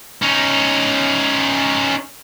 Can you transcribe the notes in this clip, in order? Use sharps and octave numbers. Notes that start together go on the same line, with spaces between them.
C#4 D#4